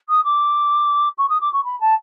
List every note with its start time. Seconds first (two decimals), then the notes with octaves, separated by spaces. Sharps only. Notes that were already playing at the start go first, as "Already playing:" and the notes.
0.09 D#6
0.24 D6
1.18 C#6
1.29 D#6
1.40 D6
1.53 C#6
1.64 B5
1.80 A5